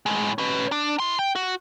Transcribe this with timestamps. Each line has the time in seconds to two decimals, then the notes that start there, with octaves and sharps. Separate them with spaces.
0.06 A2 G#3
0.38 C#4 B4
0.72 D4
1.00 E4 C6
1.19 G5
1.35 F#4